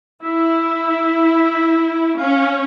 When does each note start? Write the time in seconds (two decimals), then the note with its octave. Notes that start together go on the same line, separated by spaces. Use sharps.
0.23 E4 E5
2.18 C#4 F5